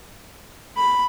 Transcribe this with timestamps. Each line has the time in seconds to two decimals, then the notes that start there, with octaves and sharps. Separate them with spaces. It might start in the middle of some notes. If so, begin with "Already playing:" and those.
0.77 B5